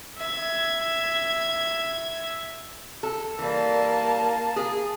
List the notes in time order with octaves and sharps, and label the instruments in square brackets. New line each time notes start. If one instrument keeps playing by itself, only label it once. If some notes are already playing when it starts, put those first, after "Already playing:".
[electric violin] E5 G#6
[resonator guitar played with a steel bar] A4
[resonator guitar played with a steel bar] E3 G3 [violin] A#3 A5
[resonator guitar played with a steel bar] G#4